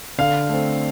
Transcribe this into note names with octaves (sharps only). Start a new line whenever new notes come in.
D3 F5
A3 C4